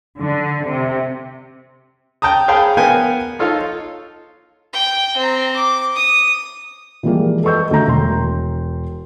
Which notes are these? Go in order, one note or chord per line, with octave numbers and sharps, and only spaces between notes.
D3
C3
G5 A5 A#5 D#6
G#4 C#5 F5 G5 A5 B5
B3 A#4 F5 G5 G#5
D#4 F4 A4 C#5 F5
G5
C4 A#5
D6
D#6
E3 F3 G3 G#3 A#3 G#4
A4 B4 D#5 C#6 E6 G6
D2 A3 A#5 G6
E1 C6